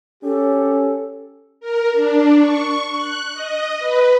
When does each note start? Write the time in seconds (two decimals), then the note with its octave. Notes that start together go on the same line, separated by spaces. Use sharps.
0.24 C#4 G4 A4
1.60 A#4
1.92 D4
2.38 C#6
2.92 F#6
3.33 D#5
3.79 B4